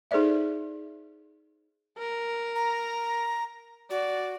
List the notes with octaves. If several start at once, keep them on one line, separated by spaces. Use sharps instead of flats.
D#4 G#4 A4 C5 D5 E5
A#4
A#5
F#4 D5